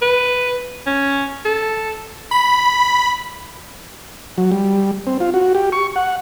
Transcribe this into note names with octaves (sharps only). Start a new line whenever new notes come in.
B4
C#4
A4
B5
F#3
G3
C4
F4
F#4
G4
C#6
F#5